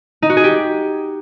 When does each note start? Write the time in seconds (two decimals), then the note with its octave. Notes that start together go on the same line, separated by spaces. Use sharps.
0.22 D#4
0.30 F#4
0.37 G#4
0.44 G4